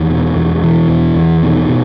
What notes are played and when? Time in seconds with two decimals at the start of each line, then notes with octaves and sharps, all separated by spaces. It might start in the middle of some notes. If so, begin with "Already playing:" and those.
Already playing: E2 D#3
0.10 B2
0.36 E2
0.63 B2 E3
0.89 E2
1.16 E2
1.43 B2 D#3
1.69 B2